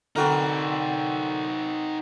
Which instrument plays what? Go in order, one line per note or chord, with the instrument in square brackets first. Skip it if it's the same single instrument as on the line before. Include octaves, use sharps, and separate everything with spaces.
[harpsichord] D3 A3 [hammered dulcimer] C4 F#4 A#4 [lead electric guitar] D#4 B4